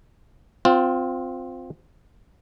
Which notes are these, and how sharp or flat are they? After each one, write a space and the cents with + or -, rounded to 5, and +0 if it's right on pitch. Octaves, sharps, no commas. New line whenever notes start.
C4 -10 F4 +15